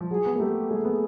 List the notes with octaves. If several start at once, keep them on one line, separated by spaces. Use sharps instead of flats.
F3
F#3 G#4
B3
A#3 G#4
A3 G4
A3 G#4
B3